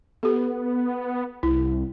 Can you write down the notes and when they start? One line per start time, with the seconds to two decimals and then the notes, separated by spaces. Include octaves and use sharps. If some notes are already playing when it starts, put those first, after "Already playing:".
0.23 B3 G4 A4
1.43 C2 E4